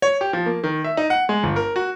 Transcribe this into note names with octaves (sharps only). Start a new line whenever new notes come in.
C#5
G4
F3
A#3
D#3
E5
D#4
F#5
G#3
G1
A#4
F#4